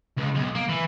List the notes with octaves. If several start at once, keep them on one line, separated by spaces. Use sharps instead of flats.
C#2
B1
A#3
E3